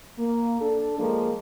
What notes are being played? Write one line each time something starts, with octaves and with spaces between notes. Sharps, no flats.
A#3
D4 A4
F3 G#3 A#3